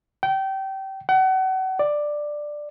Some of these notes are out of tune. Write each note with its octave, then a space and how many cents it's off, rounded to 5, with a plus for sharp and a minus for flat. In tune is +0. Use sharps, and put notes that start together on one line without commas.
G5 -25
F#5 +35
D5 +10